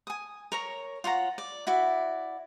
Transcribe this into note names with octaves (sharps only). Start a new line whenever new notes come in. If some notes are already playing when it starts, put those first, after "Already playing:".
G#5 D#6
A#4 C#5 A#5
F4 C#5 F#5 A#5
D5
E4 F#4 D5 E5